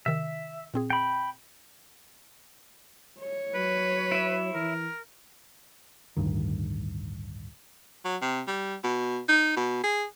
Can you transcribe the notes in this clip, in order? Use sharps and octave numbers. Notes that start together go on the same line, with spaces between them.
C3 D#3 E5
A#2 C4 G#4
G5 B5
C#5
F#3 B4
E4 E5
E3 A#4
A1 D2 G2 D#3
F#3
C3
G3
B2
D#4
B2
G#4